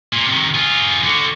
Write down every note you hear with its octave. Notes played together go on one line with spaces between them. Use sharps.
A#2
C3 D#3
F4 G#4
D3 F#4